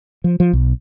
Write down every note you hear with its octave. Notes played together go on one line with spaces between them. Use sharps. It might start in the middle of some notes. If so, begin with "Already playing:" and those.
F3
F3
B1